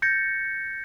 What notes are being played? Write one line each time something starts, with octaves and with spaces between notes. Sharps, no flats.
G6 A6 A#6 C#7